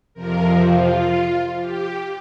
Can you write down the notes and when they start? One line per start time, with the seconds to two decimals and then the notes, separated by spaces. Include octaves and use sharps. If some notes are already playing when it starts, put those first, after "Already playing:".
0.14 F2 C3 F3 A#4
0.63 F4
1.59 G4